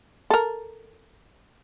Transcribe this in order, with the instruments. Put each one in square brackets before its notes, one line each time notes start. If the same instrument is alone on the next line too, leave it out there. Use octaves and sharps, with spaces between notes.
[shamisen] A4 A#4